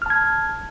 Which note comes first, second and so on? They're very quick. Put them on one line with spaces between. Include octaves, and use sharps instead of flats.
F6 A5 G#6